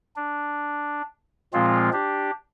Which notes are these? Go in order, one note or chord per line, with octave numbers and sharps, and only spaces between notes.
D4
A#2 F3 G#3 C4 F4
D4 G4